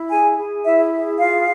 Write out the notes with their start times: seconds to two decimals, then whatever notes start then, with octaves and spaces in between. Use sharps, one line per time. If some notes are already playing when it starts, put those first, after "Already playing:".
Already playing: E4
0.10 G#4 G#5
0.38 G#4
0.65 E4 E5
0.93 G#4
1.20 F4 F5